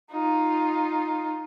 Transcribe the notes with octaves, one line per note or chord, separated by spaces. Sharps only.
D#4 F4